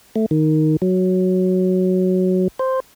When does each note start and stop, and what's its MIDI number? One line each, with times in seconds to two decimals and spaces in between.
0.16 0.26 57
0.31 0.77 51
0.82 2.48 54
2.59 2.80 72